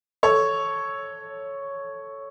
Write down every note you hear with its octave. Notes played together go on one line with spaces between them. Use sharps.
A4 C#5